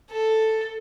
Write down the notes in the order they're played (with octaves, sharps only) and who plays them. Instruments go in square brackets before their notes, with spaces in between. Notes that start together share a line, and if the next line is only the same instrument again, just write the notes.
[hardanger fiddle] A4